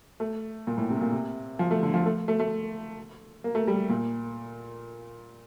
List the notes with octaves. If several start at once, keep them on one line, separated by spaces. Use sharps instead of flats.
A3
A#2
A2
C3
A#2
C3
F3
A3
D3
F3
A3
A3
A3
A#3
A3
G3
A#2